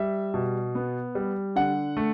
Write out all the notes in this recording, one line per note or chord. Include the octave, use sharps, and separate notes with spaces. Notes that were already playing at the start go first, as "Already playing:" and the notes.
Already playing: G3 E5
B2
B3
G3
D3 F#5
A3